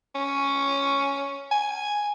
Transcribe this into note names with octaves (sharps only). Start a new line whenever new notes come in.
C#4
G#5